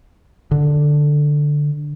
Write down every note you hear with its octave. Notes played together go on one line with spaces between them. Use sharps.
D3